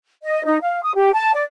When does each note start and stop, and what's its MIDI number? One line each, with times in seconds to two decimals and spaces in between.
0.24 0.43 75
0.44 0.57 63
0.62 0.82 77
0.83 0.91 87
0.95 1.11 67
1.13 1.32 81
1.34 1.43 74